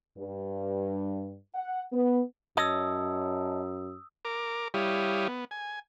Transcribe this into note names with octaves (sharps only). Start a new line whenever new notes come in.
G2
F#5
B3
F#2 C#5 D#5 A5 D#6 E6
A#4 D6
G3 E4 G4 C#5 F5 D#6
B3
G#5